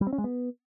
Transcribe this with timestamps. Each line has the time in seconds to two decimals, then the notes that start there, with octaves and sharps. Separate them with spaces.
0.01 G3
0.07 C4
0.13 C#4
0.18 G#3
0.24 B3